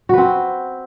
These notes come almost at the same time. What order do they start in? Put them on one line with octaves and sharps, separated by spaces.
F#4 B4 C4